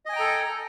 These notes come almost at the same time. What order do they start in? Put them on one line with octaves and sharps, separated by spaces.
D#5 G#5 G5 A#5 A4